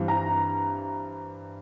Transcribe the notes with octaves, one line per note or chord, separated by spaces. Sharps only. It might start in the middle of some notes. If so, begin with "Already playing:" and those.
Already playing: G2 E3 G3 C4
A#5